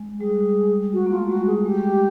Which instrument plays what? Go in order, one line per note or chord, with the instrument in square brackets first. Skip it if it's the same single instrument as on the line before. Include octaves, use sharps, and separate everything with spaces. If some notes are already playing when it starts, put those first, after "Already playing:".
Already playing: [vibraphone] G#3
[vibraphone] G3 [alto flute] G#4
[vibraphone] G#3 [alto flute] F#4
[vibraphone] A#3
[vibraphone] A3 [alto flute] F4
[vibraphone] G#3
[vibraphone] G3 [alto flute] F#4
[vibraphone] G#3 [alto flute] G#4
[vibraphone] G#3 [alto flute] G4